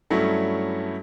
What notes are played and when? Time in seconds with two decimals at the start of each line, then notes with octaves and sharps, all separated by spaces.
0.10 G2 F#3 A3 C#4 E4